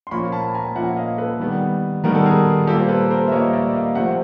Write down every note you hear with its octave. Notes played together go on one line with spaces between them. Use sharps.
C6
A#2 F3 A#3 C#4 B5 C#6
A5 B5
G#5 A#5
A#2 F3 A#3 C#4 E5 F#5
D#5 F5
A4 B4
D#3 G3 B3
D#3 G3 B3 A#4
A4
G#4 A#4
A#2 G3 A#3 G4 A4
C5
A4 B4
A#4 C5
E5
A#2 G3 A#3 C#5 D#5
D5 E5
D#5 F5
C3 F3 A3 C4 E5 F#5